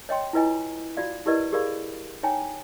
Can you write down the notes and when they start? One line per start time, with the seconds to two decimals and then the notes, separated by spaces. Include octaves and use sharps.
0.09 C#5 D#5 G5 C6
0.33 E4 F4 B4 D#5 G#5 A#5
0.97 F4 F#4 D5 F5
1.26 E4 G4 A#4 B4 D5 D#5
1.52 G4 G#4 A#4 D5 F5 B5
2.23 D#4 C#5 G5 G#5 A#5